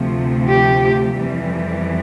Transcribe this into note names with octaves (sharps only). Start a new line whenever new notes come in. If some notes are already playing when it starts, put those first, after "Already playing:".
Already playing: D2 C3 F3 A3
G4
F2 E3 G3